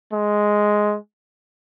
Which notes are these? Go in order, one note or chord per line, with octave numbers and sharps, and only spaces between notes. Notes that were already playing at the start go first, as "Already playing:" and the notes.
G#3